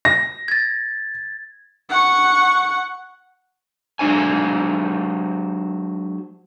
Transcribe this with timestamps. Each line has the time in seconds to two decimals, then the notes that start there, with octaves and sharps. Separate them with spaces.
0.05 A#6
0.48 G#6 A6
1.90 F#5 C#6
3.99 F#3 G#3 D4 C5 G#5